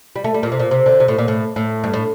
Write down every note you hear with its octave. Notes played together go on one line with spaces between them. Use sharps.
G3
A3
G3
A#2
C3
A#2
C3
D3
C3
A2
A#2
A2
A2
G2
A2